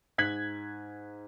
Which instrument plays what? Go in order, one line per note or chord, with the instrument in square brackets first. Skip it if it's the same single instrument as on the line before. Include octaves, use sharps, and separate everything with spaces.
[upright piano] G#2 F#6 G#6 B6 F#7